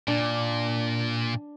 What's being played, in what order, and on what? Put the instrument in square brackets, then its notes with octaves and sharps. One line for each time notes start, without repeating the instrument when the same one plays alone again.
[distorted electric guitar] A#2 [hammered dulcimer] D4